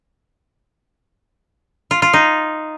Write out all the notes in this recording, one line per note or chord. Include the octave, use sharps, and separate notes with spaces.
F4
F4
D#4